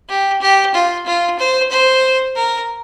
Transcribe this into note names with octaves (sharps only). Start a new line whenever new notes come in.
G4
G4
F4
F4
C5
C5
A#4